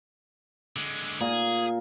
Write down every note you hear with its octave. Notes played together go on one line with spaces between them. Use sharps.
D3 G#3
A#2 G#4